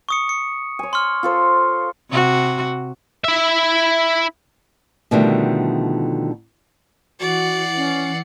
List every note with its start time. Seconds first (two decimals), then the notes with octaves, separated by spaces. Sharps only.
0.09 C#6 D#6 C#7
0.29 C#7
0.79 C#5 G#5
0.93 C6 C#6 F6
1.23 F4 A4 C5
2.11 C3 F#4
3.24 E4 E5
5.11 B2 D3 D#3 F3 G3 A3
7.20 E3 F#4 D5 F#5 C7 C#7
7.76 C#4